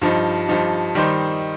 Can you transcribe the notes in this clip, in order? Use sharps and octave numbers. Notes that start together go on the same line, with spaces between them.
G2 F3 D#4
G2 F3 D#4
D#3 G3 D#4 C5